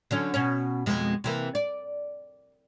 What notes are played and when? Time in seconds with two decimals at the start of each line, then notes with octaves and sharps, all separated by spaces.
0.11 D3 F#3 C#4
0.34 B2 C#4
0.86 F2 B2 G#3
1.24 C3 E3 A#3
1.55 D5